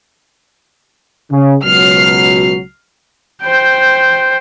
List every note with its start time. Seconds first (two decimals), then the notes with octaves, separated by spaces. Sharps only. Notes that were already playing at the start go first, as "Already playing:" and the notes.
1.31 C#3
1.64 C#2 B2 F#3 F6 C7
3.42 C5 G5